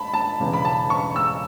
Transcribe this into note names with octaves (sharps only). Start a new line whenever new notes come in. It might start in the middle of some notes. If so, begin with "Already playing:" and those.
Already playing: A5 B5
A5
E1 E2 C#3
B5
A5
C#6
E6